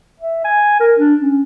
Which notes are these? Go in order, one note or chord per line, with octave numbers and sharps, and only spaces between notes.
E5
G#5
A#4
D4
C#4